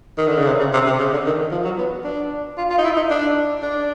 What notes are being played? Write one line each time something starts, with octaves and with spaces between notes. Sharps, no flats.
D#3
D3
C#3
C3
C#3
C3
C3
C#3
D3
D#3
F3
F#3
B3
D4
F4
F4
D#4
E4
D#4
D4
D4